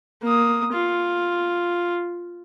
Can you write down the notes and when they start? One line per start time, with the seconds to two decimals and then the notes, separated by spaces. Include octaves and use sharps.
0.23 A#3 D#6
0.73 F4